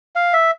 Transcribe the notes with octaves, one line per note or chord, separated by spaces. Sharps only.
F5
E5